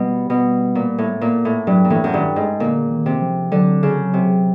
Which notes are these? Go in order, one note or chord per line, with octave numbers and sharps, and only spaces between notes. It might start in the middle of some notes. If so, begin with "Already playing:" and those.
Already playing: B2 G3
B2
A#2
A2
A#2
A2
G2 F#3
A#2
A2 E3
F#2
G2 D#3
G#2
A#2 D3
D#3
C3
F3
D3 F#3
C#3
C3